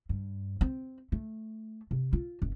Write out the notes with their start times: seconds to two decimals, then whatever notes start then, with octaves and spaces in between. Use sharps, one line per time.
0.09 G2
0.61 C4
1.12 A3
1.91 C3
2.13 F4
2.42 F#1